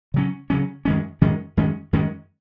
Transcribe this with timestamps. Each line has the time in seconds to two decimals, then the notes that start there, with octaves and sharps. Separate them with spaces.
0.14 C#3 F#3 C#4
0.50 C#3 F#3 C#4
0.85 F#2 D#3 G#3 C#4
1.21 F#2 D#3 G#3 C#4
1.57 F#2 D#3 G#3 C#4
1.93 F#2 D#3 G#3 C#4